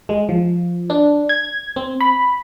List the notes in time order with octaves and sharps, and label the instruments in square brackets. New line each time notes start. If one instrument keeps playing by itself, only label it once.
[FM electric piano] G#3
F3
D4
G#6
C4
B5